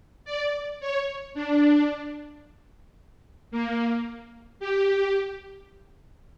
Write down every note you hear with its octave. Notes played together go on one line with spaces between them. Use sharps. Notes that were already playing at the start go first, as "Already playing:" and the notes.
D5
C#5
D4
A#3
G4